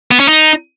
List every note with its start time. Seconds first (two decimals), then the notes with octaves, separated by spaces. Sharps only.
0.11 B3
0.20 C#4
0.28 D#4